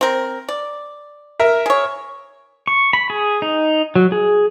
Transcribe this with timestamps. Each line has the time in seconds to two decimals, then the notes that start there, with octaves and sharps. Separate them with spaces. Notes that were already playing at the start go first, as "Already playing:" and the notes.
0.01 C4 A#4
0.49 D5
1.40 A#4 E5
1.66 G#4 C#5
2.67 C#6
2.93 B5
3.10 G#4
3.42 D#4
3.96 F#3
4.12 G#4